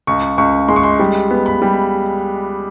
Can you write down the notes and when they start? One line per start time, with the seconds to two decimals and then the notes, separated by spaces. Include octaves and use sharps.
0.07 C#2 C#6
0.38 C#2 C#6
0.68 G#3 C6
0.76 C#6
0.84 C6
1.00 G3
1.31 B3
1.46 B5
1.62 G3